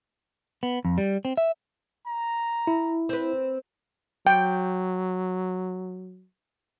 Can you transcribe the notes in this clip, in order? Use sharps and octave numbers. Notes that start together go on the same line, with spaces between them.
B3
F2
G3
C4
E5
A#5
E4
C4 B4
F#3 G5